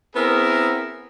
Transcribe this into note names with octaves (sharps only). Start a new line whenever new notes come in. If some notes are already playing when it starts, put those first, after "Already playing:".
B3 C4 E4 G#4 A#4